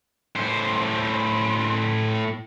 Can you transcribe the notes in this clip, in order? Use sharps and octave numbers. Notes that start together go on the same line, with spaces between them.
A2 C5